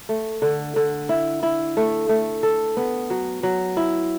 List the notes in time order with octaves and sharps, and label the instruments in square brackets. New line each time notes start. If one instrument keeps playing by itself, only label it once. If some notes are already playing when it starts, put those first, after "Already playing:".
[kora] A3
D3
D3
E4
E4
A3
A3
A4
B3
F#3
F#3
E4